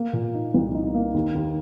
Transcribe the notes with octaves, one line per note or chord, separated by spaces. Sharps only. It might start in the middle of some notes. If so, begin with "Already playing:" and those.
Already playing: A#3
A#2
D#4
C2
D#4
A#3
D#2
D#2